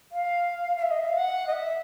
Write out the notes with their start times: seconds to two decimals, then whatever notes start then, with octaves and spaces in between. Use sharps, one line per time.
0.12 F5
0.77 F5
0.82 E5
0.91 D#5
0.99 E5
1.08 F5
1.17 F#5
1.48 D#5
1.52 E5